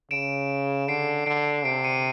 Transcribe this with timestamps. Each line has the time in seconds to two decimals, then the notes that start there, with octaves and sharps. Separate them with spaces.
0.11 C#3 D7 E7
0.88 D3 C7 D7
1.26 D3 C7 D7
1.65 C3 C7 D7
1.84 C#7 D#7